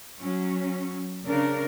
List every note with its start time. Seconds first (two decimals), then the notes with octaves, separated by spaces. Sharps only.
0.17 F#3 C#4
1.25 C#3 D4 A#4